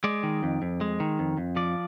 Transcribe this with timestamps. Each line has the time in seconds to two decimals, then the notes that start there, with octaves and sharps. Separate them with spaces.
0.04 G#3 D5
0.23 D#3
0.43 F2
0.62 F2
0.81 G#3
1.00 D#3
1.19 F2
1.37 F2
1.56 F3 D5